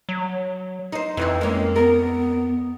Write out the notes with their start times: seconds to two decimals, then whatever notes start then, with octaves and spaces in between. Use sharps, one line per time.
0.09 F#3
0.92 D#4 C5
1.17 F2 E3 C4 D#4
1.41 G#3 A#3 C#4
1.76 B3 A#4